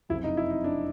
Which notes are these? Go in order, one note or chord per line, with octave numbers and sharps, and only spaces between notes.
F#1 F2 C3 E4
D#4
E4
D#4
D4